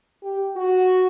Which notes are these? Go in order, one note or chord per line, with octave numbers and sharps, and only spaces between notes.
G4
F#4